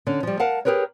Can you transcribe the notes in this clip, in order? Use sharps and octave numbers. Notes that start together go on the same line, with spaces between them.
D3 C#4
F3 G3
A#4 F5 F#5 A5
G4 G#4 A#4 B4 C#5